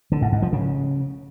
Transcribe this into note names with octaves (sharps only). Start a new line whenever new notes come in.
D3
G#2
G#2
F3
C#3